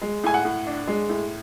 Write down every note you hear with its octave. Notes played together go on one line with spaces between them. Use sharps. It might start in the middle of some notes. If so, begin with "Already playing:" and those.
G#3
A2 G#5
F#5
A2
D4
G#3
A2